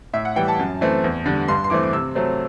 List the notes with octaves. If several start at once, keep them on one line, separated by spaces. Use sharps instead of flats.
A2 E5
F#5
E3 G3 G5
A5
F#2
E3 A3 C4
E2
D3 G3
G2 C6
C6
E3 A3 C4 D6
D6
C3 E6
F#3 A3 C4